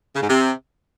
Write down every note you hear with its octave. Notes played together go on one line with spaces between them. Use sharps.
C#3
G#2
C3